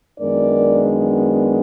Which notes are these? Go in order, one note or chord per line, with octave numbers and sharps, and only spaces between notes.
F#2 D#3 G#3 B3 D4 A#4 D5